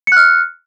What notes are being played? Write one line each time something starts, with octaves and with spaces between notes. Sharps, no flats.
F6 F#6 C#7